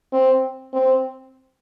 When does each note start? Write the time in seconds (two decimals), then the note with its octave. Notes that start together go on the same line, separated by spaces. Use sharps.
0.13 C4
0.73 C4